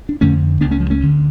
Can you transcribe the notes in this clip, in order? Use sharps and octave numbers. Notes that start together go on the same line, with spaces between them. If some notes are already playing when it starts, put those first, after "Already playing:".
D4
F2 D3 A3 C#4
C#2 C#3 B3 D4
A3 C#4
F3
A3 C#4
D2 D3